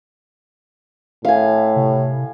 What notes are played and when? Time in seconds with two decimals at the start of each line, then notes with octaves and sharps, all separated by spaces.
1.25 A2 E5 F5 G#5
1.76 C3